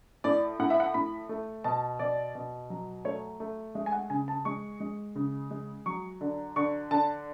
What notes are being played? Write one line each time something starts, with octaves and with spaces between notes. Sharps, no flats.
A2 D5
A2 F#5
E5
F#5
A2 B5
A3
B2 A5
B2 D5
B2
F#3
A3 C#5
A3
G#3 E5
G#5
F#5
C#3 G#5
A5
G#3 C#6
G#3
C#3
G#3
F#3 C#6
D3
D3 C#6
D3 A5